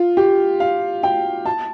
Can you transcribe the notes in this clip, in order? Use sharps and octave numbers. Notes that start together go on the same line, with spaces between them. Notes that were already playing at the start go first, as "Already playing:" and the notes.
Already playing: F4
G4
F5
G5
A5